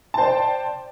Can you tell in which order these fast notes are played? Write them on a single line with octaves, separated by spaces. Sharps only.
A5 C5 D5 G5